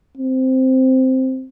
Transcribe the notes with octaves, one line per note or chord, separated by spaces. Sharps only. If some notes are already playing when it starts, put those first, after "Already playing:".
C4